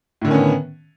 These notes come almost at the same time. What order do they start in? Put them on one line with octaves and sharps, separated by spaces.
A2 D3 D#3 C#4 B3